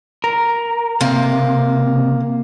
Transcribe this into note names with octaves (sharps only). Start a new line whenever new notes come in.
A#4
C3 A#3